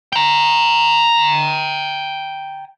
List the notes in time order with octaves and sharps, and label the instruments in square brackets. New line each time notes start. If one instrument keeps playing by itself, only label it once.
[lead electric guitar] G5 A#5